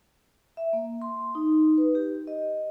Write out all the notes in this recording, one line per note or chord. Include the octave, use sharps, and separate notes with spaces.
E5
A#3
C6
D#4
B4
G4
D#5